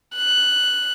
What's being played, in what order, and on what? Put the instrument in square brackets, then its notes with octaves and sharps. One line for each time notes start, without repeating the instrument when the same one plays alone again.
[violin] F#6